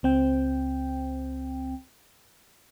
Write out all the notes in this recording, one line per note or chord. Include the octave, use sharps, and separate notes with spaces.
C#2 C4 G5